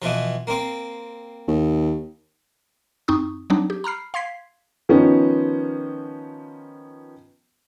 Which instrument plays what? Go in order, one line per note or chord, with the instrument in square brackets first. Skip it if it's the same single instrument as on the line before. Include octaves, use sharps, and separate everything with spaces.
[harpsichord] B2 E3 F3
A#3 C4
[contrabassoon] D#2
[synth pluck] F#2 C4 D#4 C#6 D#6
F#3 G3 C4 D4 D#4
G4
A#5 B5 F6 C7
F5 C6 G#6 B6 C7
[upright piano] D#3 F3 B3 C#4